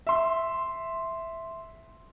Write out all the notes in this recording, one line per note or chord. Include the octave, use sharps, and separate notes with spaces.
E5 C6